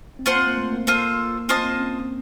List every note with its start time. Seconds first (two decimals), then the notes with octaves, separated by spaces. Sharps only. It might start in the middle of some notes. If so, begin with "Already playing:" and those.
0.19 C4
0.26 A#3 F4 C5 F#5 A5
0.36 C4
0.47 A#3
0.57 A3
0.72 A#3
0.87 A#3 F4 A4 C5
1.48 C4 F4 C5 D#5 A5
1.58 A#3
1.63 C4
1.74 C4
1.79 C#4